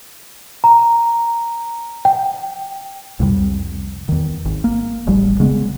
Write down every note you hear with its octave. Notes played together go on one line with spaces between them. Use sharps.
A#5
G5
C2 F2 C3 G3
E2 D#3
G#1
A#3
E1 A1 G3
C#3 G#3 B3